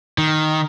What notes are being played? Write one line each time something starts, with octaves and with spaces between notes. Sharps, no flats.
D#3